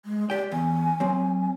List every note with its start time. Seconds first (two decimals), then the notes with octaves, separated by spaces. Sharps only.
0.06 G#3
0.30 G4 D5 G5
0.52 E2 G#5
1.00 F#3 C4